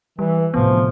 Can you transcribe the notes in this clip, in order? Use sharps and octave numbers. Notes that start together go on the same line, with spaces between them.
E3 G3
D2 A2 C3 F3 B3